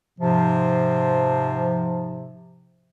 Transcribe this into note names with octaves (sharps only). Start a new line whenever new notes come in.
G#2 C3 F3